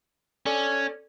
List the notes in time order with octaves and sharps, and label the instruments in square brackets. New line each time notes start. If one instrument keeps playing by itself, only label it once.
[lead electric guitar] C#4 [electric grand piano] A4 D5